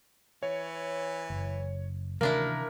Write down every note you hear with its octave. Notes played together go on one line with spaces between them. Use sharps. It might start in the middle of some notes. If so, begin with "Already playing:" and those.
E3 C#5
F#1
D2 C3 D#3 E3 A#3 D4 E4 A#4